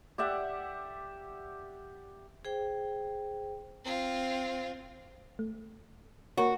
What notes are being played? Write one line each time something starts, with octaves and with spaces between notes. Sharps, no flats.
G4 D5 E5 F#5
G#4 C5 G5
C4 F4
A3
A#3 F#4 A#4 C#5